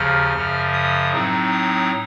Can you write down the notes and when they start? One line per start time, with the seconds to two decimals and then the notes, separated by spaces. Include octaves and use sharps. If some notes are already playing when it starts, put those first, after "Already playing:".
Already playing: D#2 C#3 F3 F6
0.34 F#2 C#3 F3
0.73 D#6
1.13 A2 F#3 C4 D#4
1.52 D#6